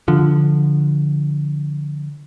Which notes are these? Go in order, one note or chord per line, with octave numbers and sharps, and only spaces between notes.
D3 F3